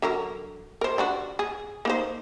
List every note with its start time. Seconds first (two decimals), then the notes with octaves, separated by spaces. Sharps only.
0.02 D3 F#3 A#4
0.81 A#4 C5
0.98 G3 D4 F#4
1.39 G#4
1.85 A#3 D#4 C5